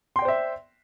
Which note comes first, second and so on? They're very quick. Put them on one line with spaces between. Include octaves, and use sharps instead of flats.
C6 G5 D5 C5 E5